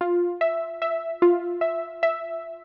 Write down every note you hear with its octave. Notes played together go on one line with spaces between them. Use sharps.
F4
E5
E5
F4
E5
E5